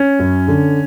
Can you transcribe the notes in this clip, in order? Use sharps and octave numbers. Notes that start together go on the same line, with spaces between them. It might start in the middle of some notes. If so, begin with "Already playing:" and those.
Already playing: C#4
F#2
D3